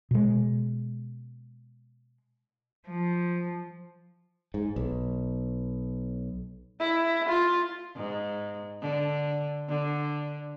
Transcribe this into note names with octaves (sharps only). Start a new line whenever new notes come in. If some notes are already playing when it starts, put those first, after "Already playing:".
B2 G#3
F3
G#2
B1
E4
F4
G#2
D3
D3